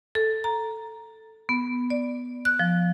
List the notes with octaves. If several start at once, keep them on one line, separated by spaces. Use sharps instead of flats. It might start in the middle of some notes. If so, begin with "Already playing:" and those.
A4
A#5
B3
D5
F#6
F3